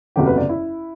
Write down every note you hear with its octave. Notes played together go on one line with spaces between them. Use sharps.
F#1 E2 C3 F#3 A3 G4
B4
D5
E4